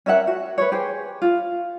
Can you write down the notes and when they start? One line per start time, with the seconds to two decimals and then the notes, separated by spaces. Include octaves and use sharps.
0.06 C#4 A#4 E5 F#5
0.27 F#4
0.58 B4 C#5
0.72 G4 G#4 C5
1.22 F4